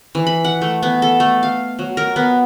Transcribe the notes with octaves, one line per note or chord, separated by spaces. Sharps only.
E3
B5
F#5
A3
B3
A4
A3
F5
F#3
A#4
B3